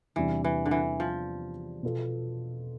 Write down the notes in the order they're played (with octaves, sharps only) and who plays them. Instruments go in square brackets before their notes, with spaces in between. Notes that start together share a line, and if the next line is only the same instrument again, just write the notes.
[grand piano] E2 C3 G3 D4 [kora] E3
[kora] E3
D3
E3
F3
[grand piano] B2 B3 F4 A4